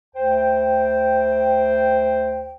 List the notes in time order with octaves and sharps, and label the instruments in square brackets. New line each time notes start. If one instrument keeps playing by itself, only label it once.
[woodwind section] D2 C5 G5